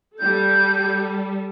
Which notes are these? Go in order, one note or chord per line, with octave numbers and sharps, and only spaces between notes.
G3 A4 G6